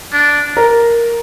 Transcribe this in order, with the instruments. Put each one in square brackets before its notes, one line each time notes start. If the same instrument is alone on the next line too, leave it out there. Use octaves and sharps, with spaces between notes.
[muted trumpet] D4
[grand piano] A#4